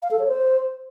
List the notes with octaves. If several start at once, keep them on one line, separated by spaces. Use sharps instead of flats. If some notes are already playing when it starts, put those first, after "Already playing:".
F5
A4
C#5
C5